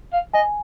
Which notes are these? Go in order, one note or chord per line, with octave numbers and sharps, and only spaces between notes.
F5
D#5 G#5